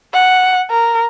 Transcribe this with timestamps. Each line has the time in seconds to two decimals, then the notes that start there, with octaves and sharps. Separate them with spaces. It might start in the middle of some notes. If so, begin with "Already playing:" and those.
0.14 F#5
0.70 A#4